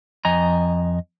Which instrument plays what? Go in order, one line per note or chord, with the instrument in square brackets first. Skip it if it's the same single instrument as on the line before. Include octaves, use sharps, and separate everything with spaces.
[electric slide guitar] F2 D#5 G#5 A#5